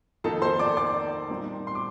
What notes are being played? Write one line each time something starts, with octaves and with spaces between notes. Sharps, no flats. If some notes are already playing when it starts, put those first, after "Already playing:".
F2 D#3 A#3 D#4 A4 A5
C5 C6
D5 D6
D5 D6
A#2 G3 C4 D#4
C6
D6